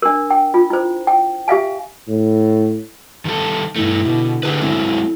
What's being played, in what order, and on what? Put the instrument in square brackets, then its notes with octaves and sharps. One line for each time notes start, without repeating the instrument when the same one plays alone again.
[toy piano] D4 A#4
G5
F4
E4 C5
G5
G4 E5 F5 G#5
[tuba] A2
[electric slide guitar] D#3 G3 A4
[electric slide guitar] G2 A3 [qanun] E3 D#4
[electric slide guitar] B2 [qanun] D3 G4
[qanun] D3 A3 E5 [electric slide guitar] G4 G#4 B4
[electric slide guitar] F#3 G#3 C4 [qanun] E4 E5